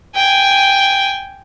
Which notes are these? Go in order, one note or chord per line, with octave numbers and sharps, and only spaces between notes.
G5 G#5